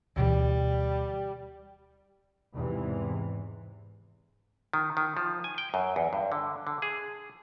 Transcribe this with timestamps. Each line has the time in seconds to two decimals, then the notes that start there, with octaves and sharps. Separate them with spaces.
0.16 D2 B2 E3 G3
2.53 E2 G#2 C3 E3
4.73 D#3
4.97 D#3
5.17 F3
5.44 G#5
5.58 G5
5.74 F#2
5.96 E2
6.13 G2
6.32 D3
6.67 D3
6.82 G#4